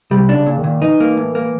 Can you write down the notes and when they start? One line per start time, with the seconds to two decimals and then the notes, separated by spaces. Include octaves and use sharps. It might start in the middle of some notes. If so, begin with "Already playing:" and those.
0.11 C3 G3
0.29 D4
0.34 C#3
0.46 A#2
0.58 D#3
0.64 A#2
0.81 E3 D#4
1.00 A#3
1.17 A2
1.35 A#3